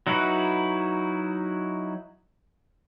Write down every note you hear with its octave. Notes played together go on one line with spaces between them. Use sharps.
F#3 D#4 E4 F#4 B4